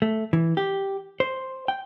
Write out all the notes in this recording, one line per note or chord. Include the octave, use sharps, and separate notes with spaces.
A3
E3
G4
C5
G5